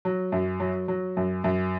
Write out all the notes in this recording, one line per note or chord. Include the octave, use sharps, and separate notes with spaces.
F#3
F#2
F#3
F#3
F#2
F#2